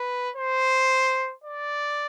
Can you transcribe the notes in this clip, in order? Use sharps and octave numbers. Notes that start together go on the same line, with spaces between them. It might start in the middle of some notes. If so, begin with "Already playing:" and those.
Already playing: B4
C5
D5